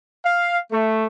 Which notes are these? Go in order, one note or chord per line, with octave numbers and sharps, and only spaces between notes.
F5
A3